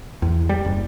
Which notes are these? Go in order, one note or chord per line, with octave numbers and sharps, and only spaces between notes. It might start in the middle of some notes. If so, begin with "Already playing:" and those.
E2
G3
F#1